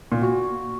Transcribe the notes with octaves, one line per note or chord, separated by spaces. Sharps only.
A#2
F#4